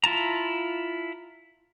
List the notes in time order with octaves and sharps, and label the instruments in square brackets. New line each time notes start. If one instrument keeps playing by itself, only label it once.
[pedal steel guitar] E4 F4 A5 A#5